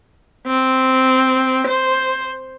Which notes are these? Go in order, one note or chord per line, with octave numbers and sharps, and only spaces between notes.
C4
C5